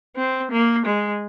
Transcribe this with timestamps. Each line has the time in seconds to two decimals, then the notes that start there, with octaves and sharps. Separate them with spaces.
0.16 C4
0.51 A#3
0.86 G#3